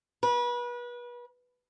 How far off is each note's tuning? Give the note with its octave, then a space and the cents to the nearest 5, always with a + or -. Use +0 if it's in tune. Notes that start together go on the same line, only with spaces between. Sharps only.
B4 -30